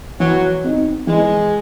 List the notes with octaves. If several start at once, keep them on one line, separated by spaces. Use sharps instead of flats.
E3 F#3
C4 D#4
E3 G#3